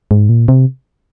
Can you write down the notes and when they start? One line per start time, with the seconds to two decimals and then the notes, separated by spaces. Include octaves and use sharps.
0.11 G#2
0.29 A#2
0.48 C3